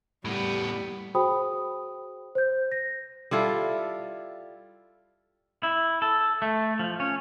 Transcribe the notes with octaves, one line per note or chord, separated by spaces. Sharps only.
A2 G3 B3
F#4 G#4 C5 G5 B5 D#6
C5 G6
A#6
G3 E4 F4 A4
E4
A4
A3
F3
C#4